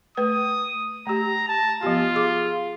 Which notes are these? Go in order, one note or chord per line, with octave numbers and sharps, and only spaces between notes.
A3 B4 D#6
A3 G4 A#5
A5
F3 B3 F4 G4
G#4 D6